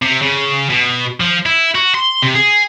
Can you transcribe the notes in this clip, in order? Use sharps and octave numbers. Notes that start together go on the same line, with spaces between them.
C3
C#3
B2
F3
E4
F#4
C6
C3
G#4